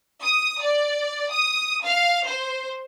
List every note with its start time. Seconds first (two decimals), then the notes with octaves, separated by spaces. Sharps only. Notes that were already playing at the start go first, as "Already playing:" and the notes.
0.23 D#6
0.62 D5
1.31 D#6
1.85 F5
2.26 C5